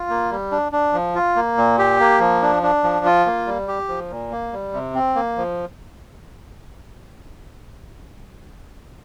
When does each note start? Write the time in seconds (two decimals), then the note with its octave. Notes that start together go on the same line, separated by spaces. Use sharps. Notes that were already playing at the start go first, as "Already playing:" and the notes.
Already playing: F4
0.10 A#3
0.31 G3
0.52 D4
0.72 D4
0.93 F3
1.15 F4
1.36 A#3
1.57 A#2
1.79 G4
2.00 A#3
2.20 F3
2.42 D4
2.63 D4
2.83 F3
3.05 F4
3.26 A#3
3.47 G3
3.68 G4
3.89 F3
4.10 A#2
4.32 A#3
4.53 G3
4.73 C3
4.95 C4
5.15 A#3
5.37 F3